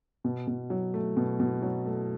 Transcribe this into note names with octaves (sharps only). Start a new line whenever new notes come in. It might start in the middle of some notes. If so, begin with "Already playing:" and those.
B2
B2
F#3
A3
B2
B2
F#3
A3